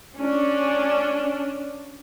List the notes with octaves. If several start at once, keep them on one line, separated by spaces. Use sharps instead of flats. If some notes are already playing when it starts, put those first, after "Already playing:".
C#4 D4